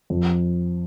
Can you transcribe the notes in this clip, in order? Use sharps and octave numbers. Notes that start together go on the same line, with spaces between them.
F2